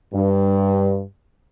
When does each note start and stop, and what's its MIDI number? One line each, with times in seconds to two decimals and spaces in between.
0.13 1.02 43